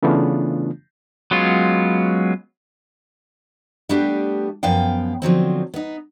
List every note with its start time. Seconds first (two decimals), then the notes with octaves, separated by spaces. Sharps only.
0.03 C#3 E3 A3 B3 D4 F4
1.31 F#3 G#3 B3 C#4 F4
3.89 G3 A3 B3 D4 G4
4.63 F#2 F3 B3 F5 G5
5.22 D3 F3 F#3 C4
5.74 B3 D#4